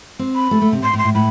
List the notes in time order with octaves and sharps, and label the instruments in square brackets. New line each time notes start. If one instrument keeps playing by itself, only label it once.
[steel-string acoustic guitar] C4
[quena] B5
[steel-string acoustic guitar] A3
A3
C3
[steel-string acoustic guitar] A2 [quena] C6
[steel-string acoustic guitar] A2
[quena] C6
[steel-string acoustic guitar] A2
[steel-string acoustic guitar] A2 [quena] B5